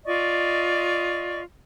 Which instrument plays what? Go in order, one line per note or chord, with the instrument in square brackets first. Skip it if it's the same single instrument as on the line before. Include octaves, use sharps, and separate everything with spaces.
[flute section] F4 D5 D#5 C#6